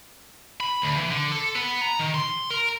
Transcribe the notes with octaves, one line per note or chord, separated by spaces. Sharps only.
B5
D2
E3
D3
A4
B3
A#5
D#3
C6
A#4